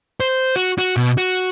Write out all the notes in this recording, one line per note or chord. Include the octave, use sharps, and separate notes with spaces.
C5
F#4
F#4
B2
F#4